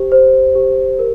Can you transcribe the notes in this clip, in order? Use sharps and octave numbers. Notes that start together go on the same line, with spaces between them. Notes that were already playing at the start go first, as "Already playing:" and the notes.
Already playing: G4 C5
C5
G4
A#4